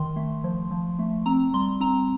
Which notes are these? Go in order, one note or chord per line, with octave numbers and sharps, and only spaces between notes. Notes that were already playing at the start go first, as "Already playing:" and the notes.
Already playing: D#3 C6
A3
F3
F3
A3
C4 A#5
G3 C6
C4 A#5